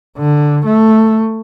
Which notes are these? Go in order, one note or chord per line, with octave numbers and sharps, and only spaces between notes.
D3
A3